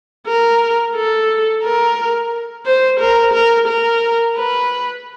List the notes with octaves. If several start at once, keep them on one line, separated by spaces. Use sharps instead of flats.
A#4
A4
A#4
C5
A#4
A#4
A#4
B4